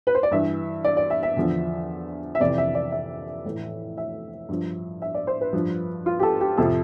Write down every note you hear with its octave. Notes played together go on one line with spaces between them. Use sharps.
B4
C5
D5
G2 E3 E5
D5
D5
E5
E5
E2 D3 F3
E5
F2 C3 E3 D5
E5
D5
E5
A2 E3
E5
G2 F3
E5
D5
C5
B4
G2 F3
F4
G4
A4
G4
F2 C3 F3 A4